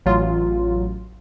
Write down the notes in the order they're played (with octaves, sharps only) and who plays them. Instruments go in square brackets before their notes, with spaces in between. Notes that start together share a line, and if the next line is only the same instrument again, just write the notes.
[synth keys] A1 F#3 F4